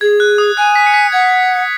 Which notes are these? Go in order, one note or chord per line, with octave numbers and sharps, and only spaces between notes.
G#4 G#6
F#6
D#6
G#5 F#6
B6
C#7
B6
F#5 G#6